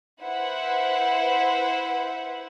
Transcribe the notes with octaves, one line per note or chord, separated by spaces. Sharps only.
E4 B4 C5 E5 F#5